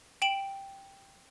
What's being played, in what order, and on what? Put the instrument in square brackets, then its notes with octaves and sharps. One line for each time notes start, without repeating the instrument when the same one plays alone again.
[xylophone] G5 D7 E7 F#7